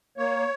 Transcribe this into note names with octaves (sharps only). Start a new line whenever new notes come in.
A#3 C#5